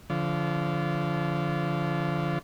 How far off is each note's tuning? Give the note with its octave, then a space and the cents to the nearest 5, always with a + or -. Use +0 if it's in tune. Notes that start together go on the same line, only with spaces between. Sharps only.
D3 -30 F3 -15